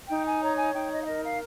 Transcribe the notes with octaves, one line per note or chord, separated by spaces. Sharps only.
D#4 G5
G#5
C#5 A#5
G#5
D#4 G5
D#5
F5
A#4 D#5
F5